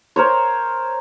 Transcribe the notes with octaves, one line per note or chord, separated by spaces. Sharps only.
A#4 C5 C#5